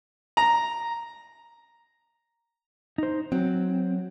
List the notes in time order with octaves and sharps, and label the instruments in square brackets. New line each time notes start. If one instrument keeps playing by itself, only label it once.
[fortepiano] A#5
[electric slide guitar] D#4 C5
[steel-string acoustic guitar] F#3 [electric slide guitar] C4